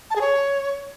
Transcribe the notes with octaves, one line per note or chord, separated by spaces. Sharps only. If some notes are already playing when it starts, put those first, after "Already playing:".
A5
G#4
C#5